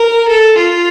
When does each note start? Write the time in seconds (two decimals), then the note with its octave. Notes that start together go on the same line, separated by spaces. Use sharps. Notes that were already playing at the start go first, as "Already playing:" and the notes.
Already playing: A#4
0.28 A4
0.57 F4